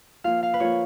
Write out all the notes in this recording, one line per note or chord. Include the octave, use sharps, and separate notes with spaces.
F3 A#3 F4 F5
F5
B4
F3 A#3 F4 C#5